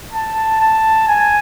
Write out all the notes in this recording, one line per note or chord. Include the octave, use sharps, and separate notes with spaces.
A5
A5
G#5